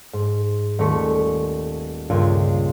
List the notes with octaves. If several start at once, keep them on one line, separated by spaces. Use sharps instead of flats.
G#2
D#1 A3 C#6 B6
C#2 G2 A#2 F4 G#6